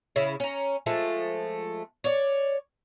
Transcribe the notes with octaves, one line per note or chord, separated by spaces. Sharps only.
C#3 E4
C#4 A#5
F3 G#3 A3
C#5 D5